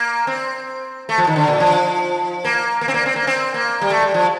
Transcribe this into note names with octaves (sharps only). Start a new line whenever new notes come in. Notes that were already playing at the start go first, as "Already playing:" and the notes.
Already playing: A#3
C4
A3
F3
D#3
D3
A#2
F3
A#3
A#3
C4
A#3
C4
A#3
C4
A#3
G3
A3
G3
F3